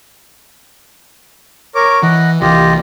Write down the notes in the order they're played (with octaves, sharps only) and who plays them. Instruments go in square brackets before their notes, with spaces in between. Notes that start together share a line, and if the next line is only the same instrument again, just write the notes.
[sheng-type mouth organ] A#4 C#5 D6
[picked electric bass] E3 [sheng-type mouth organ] D#5 F#5
[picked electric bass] C2 E3 [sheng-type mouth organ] F4 G4 D#5